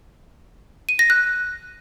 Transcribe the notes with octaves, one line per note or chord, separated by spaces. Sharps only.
D#7
A#6
F#6